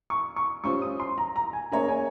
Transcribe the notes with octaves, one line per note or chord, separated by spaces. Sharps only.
C#6
C#6
G3 C#4 F4 C5 C#6
D#6
C6
A#5
A#5
G#5
A#3 C#4 G#4 C#5 A#5
G#5